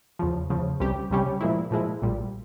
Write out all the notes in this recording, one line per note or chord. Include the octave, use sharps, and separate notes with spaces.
E2 C#3 F3
E2 C#3 F3
C#2 C3 G3 C#4 G4
C#2 C3 G3 C#4 G4
A#2 F3 G#3 E4
A#2 F3 G#3 E4
A#1 A#2 G3